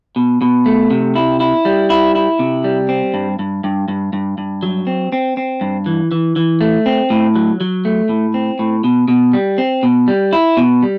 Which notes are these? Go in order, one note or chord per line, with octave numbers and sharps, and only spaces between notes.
B2
B2
A3
C3
E4
E4
G3
E4
E4
C3
G3
C4
G2
G2
G2
G2
G2
G2
F#3
C4
C4
C4
G2
E3
E3
E3
A3
C4
A2
F#3
F#3
A3
A2
C4
A2
B2
B2
G3
C4
B2
G3
E4
B2
G3